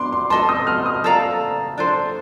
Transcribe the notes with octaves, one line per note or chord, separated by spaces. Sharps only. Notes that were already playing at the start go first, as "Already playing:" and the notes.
Already playing: D4 D5 C6 D6
C6
A4 D#5 A5 C6
D#6
F6
D#6
A4 D5 F5 A#5
D4 A4 C5